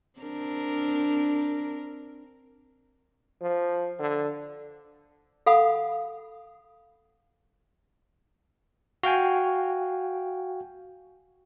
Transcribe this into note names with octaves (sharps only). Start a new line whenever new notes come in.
C4 D4 A#4
F3
D3
A4 F5 F#5 B5 D#6
F#4 F5 G5 G#5